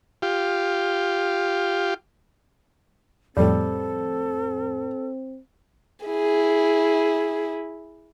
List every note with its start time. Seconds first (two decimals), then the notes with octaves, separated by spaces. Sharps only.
0.22 F4 G4
3.37 F2 A2 G3 C4 A4
6.06 E4 G#4